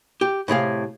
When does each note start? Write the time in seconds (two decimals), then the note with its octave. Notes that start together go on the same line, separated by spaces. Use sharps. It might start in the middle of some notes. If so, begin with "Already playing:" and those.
0.21 G4
0.48 A2 C3 G#4 F5